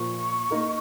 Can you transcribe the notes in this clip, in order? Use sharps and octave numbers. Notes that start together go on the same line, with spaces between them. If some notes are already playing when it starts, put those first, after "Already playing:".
Already playing: A#2 F3 A#3 F4 C#6
A#3 D#4 A#4